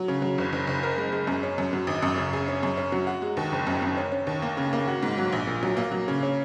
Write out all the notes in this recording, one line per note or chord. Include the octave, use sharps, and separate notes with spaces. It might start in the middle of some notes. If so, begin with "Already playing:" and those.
Already playing: F#3
C#3
F#3
F#1
F#1
F#1
A#4
G#3
G#3
F#2
C#4
F#2
F#3
G#1
F#2
C#3
G#4
C#4
F#2
C#4
F#3
F#4
G#3
D#2
F#1
F#2
F#2
C#4
C#4
D#2
A#3
C#3
A#3
F#4
G#2
F#3
A#1
A#2
F#3
A#3
F#3
C#3
C#4